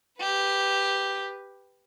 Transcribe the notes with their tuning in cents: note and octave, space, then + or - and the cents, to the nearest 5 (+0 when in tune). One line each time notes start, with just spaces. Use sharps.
G4 +0 B4 +5